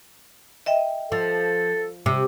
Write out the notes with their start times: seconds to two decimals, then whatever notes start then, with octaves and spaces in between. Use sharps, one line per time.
0.66 D#5 E5 G5
1.12 F3 A4
2.06 C3